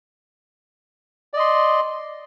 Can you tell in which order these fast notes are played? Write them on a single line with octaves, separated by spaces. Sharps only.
D5 D#5 C6